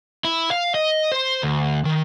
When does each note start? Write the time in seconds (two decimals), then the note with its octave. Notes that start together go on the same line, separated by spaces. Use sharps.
0.25 E4
0.51 F5
0.75 D#5
1.12 C5
1.43 D2
1.85 D#3